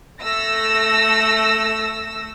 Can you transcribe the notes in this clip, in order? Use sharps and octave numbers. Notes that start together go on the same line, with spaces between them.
A3 E6 A#6